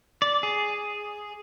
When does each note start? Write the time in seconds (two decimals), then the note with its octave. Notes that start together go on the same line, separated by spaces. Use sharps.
0.22 D5
0.43 G#4